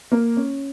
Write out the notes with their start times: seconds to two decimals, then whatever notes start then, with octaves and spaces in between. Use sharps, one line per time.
0.12 A#3
0.37 C#4